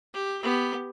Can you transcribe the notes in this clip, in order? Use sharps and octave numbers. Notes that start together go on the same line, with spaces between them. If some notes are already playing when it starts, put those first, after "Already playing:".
G4
B3 G4